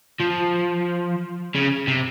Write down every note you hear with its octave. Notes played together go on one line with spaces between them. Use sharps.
F3
C#3
C3